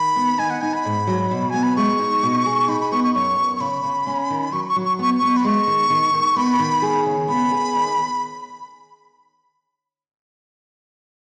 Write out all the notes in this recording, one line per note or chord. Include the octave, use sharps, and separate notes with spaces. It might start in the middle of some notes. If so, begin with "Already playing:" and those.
Already playing: D#3 B5
B3
D#4 G#5
F#5
D#4 G#5
B5
G#2
F#3
B2
B3 G#5
B5
G#3 C#6
D#4
B2
G#4
D#4 B5
B5
B3 C#6
C#6
F#2 C#6
F#2
C#6
C#3 B5
C#3
C#4
D#3
F#3 C#6
C#6
F#3
C#6
B3 C#6
B3 C#6
B5
G#3 C#6
D#3
D#3
D#3
B3 B5
D#3
G#4
C#3
B3 B5
G#4
D#2